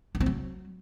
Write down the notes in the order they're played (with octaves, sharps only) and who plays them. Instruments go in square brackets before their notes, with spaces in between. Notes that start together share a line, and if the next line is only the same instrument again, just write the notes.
[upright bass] D4
C4
F#3